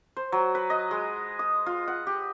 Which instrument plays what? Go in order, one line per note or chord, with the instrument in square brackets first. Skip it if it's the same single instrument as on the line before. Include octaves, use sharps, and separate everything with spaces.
[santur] C5
F#3
B4
D#5
G#3
D#6
F4
F#5
G4